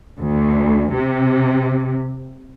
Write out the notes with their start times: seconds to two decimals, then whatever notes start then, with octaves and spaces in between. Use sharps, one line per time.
0.19 D2
0.95 C3